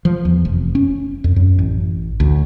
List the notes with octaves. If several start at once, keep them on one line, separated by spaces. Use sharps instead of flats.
F3
E2
F1
C#4
F2
F#2
A1
D2